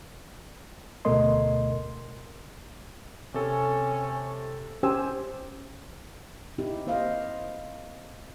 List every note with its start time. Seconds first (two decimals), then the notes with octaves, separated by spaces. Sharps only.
1.05 D2 B2 A3 A#4 D#5 C6
3.34 C3 C#4 A4
4.83 C#4 G4 C5 G#5 E6
6.58 C4 D#4 E4 G4
6.87 A#3 C5 D#5 F5